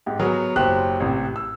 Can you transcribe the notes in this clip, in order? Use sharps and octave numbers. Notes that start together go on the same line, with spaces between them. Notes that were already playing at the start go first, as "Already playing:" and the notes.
G#2 G4
F#3 B3 F#4 G#4 A#4
F#1 F#3 G4 C5 F#6
A1 C3
E6